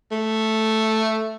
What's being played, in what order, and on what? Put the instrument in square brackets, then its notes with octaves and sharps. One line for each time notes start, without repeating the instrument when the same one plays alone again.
[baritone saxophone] A3